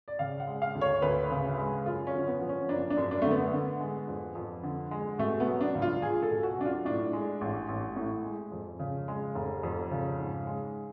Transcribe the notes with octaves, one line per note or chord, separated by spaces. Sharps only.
D5
C#3 F5
F#5
G#3
F5
D2
C#5
D2 B4
C#3
G#3
F#2 F4
C#4
D3
B3
F3
C#4
F#1 D4
D4
F#2
D4
D3 A3
B3
D3
G#3
F2
F2
D3
G#3
B2 A3
B3
F#3
D4
C#2
F4
C#2 G#4
A4
B2
F#4
F#3 D4
F4
A2 D4
G#3
A1
A1
A2
G#3
F2
C#3
G#3
F1
F2
C#3
G#2
G#3